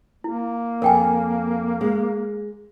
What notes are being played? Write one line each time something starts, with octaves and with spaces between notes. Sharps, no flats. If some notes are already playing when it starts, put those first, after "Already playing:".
A#3 E4
F2 A#4 G5 G#5
G#3